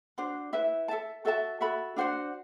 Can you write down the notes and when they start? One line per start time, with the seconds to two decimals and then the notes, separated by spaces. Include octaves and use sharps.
0.18 D4 F#4 C5
0.53 E4 B4 E5
0.88 A4 E5 A5
1.25 F#4 A4 E5 A5
1.60 F#4 A4 E5 B5
1.96 D4 F#4 C5 F#5